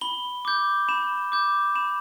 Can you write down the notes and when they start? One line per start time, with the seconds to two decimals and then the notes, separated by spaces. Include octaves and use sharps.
0.01 B5 G7
0.45 D6 G6
0.89 B5 E7
1.32 D6 G6
1.75 B5 E7